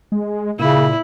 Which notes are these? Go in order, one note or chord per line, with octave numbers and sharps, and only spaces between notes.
G#3
A#2 C#3 E4